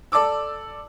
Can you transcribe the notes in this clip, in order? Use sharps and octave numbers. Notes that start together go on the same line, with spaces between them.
A4 D5 A5 D6 E6